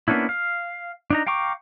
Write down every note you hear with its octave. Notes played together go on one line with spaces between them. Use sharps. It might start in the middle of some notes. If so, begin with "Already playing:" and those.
A#3 B3 C#4 D4 E4
F5
D4 D#4 A#5
F5 G5 A#5 C#6 D6